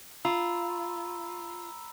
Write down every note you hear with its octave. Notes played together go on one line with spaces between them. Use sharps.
F4 A#5 B5 E6